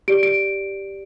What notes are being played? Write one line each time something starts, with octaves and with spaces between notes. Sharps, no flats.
G4 D5 D7
D7